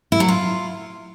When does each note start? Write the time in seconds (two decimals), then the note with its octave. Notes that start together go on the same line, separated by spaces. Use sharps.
0.12 E4
0.20 F#3
0.28 F4